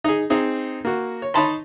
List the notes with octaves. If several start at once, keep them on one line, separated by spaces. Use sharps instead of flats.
D#4 G#4
C4 D#4 G#4
A#3 F#4
C#5
D#4 C#5 A5 B5 C6